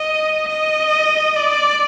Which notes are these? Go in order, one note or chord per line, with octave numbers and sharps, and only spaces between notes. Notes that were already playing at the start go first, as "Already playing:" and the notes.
Already playing: D#5
D#5
D5